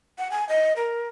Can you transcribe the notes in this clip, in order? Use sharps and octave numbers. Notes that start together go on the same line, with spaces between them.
F#5
G#5
D#5
A#4